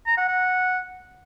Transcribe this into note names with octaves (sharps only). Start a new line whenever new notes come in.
A#5
F#5
F#5